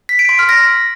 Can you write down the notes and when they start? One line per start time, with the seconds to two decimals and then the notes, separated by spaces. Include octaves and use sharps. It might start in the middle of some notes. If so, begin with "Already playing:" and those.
0.09 B6
0.19 D7
0.29 C6
0.39 F6
0.49 A#6